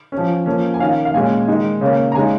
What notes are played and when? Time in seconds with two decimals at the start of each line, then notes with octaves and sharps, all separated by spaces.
0.12 C#4
0.17 F3
0.46 F3 A#3 C#4
0.74 G#5
0.79 D#3 C#4 F5
1.05 F5
1.14 A#2 G#3 C#4 G#5
1.48 D#3 G#3 D#4
1.81 C#3 A#3 C#4
2.12 A#5
2.15 C#3 G#3 D#4 G#5